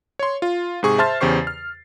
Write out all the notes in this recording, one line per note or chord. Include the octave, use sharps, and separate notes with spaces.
C#5 C6
F4
G#2 C3 G#4 C#6
C5 E5 A5 C6 F6 A6
E2 C#3 G4 C5 C#6 C7
F6